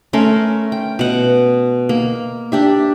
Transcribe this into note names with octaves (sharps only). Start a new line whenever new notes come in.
A3 C#4 A#4 C6
G5
B2 F#5
A#3
D4 G4 E5